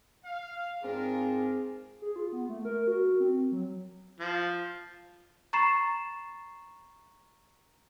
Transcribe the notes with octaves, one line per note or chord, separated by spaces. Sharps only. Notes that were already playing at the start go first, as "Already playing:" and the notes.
F5
G#2 C4 D4 F4 G#4 A#4
G#4
F4
B3
A3
A#4
F#4
C4
F#3
F3
A#5 B5 C#6 A6 C7 E7